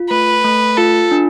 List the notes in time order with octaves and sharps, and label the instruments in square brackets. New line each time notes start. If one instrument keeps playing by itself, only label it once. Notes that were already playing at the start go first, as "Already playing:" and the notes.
Already playing: [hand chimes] F4
[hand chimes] A3 [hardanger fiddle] B4
[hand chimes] A3
[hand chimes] F4 [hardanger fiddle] A4
[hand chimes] D4